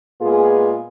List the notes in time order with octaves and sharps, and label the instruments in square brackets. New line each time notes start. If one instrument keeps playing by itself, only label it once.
[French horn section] A#2 G#3 B3 F4 G#4